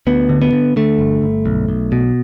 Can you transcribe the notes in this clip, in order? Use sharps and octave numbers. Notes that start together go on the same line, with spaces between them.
D2 B3
D3
B3
D3
D3 A3
G1
G1
B1
B1
B2